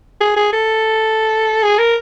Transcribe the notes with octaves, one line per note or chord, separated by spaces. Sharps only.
G#4
G#4
A4
G#4
A#4